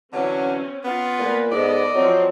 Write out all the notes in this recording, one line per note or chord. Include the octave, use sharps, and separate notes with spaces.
D3 E3 F#3 C4 C#4
B3 F4
A#2 A#3 B4
G#2 B3 A4 D5 D#5
F3 F#3 C4